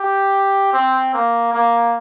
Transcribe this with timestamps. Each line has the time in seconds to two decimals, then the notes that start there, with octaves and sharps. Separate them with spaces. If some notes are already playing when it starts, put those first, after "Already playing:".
Already playing: G4
0.73 C4
1.14 A#3
1.53 A#3